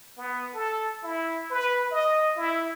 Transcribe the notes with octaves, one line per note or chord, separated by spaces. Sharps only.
B3
A4
E4
B4
D#5
E4